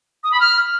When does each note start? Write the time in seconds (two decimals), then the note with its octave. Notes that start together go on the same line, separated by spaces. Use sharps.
0.24 D#6
0.32 B5
0.40 F6